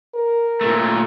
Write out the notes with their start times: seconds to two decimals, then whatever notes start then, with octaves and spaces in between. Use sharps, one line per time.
0.14 A#4
0.61 A#2 A3